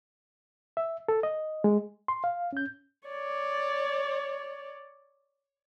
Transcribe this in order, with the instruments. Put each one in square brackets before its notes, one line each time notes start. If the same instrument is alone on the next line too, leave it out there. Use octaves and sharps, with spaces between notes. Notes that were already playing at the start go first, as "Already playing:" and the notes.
[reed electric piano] E5
A4
D#5
G#3
C6
F5
C#4 G6
[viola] C#5 D5